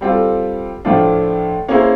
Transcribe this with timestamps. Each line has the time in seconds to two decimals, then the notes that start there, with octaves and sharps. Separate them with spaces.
0.01 G3 C4 F4 A4
0.85 A2 F3 A3 D4 F4
1.68 A#3 C#4 E4 G#4 C5